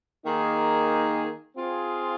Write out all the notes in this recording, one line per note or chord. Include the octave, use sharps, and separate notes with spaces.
D#3 A#3 D#4 G#4
C4 F4 G#4